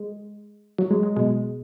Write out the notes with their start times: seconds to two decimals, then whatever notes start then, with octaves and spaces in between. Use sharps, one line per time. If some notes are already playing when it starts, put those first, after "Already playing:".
Already playing: G#3
0.78 F#3
0.91 G#3
1.03 G#3
1.16 B2 G#3